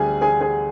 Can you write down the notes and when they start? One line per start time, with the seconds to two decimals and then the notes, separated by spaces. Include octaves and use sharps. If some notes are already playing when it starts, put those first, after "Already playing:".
Already playing: D2 D3 G3 G#4 G#5
0.22 G#4 G#5
0.41 G#4 G#5